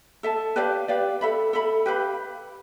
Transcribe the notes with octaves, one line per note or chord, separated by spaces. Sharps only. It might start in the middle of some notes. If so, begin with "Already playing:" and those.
A4 E5 A5
G4 B4 D5 F5
G4 B4 D5 F5
A4 E5 B5
A4 E5 B5
G4 B4 F5 B5